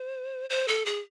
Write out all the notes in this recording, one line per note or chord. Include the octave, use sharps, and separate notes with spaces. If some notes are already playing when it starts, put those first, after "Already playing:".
Already playing: C5
C5
A4
G#4